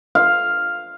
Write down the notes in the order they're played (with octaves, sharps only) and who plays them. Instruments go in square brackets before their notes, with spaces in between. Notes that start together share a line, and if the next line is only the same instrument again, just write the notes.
[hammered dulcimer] F5